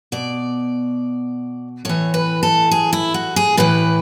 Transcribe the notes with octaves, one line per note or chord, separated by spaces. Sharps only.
B2 D5
A2 E3 C#5
B4
A4
G#4
E4
F#4
G#4
A2 E3 B4